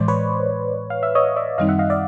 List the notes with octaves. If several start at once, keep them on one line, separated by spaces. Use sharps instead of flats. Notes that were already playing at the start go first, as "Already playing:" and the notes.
Already playing: A2 E3 G#3 C5 D5
B4 C#5
F5
E5
C#5 D#5
D5 E5
F#2 D#3 G3 C4 D#4 D#5 F5
E5 F#5
D#5 F5
D5 E5